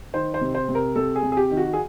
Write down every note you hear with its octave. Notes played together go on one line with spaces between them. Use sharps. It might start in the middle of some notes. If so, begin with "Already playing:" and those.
D#3 C5
C5
C3
C5
C3
A#4
C3 A4
G#4
C3
G#4
G4
D#3
F#4
G#4